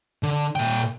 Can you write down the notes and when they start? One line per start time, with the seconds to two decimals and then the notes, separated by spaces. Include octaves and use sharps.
0.23 D3
0.56 A#2 G5